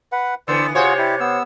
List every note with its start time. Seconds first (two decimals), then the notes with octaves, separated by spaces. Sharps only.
0.12 B4 F#5
0.48 D3 E3 B3 C5 D5 E6
0.75 C3 F4 F#4 G#4 C5 C#5
0.98 E4 G4 D5
1.20 B3 E6